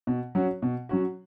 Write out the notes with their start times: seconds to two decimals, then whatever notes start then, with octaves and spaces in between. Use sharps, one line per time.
0.07 B2
0.35 F#3 C#4 F#4
0.62 B2
0.89 F#3 C#4 F#4